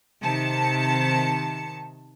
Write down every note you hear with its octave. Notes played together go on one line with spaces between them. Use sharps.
C3 D#3 A5 C#7